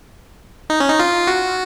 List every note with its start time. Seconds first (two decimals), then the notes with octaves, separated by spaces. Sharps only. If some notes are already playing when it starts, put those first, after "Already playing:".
0.70 D#4
0.80 C#4
0.90 D#4
0.99 F4
1.27 F#4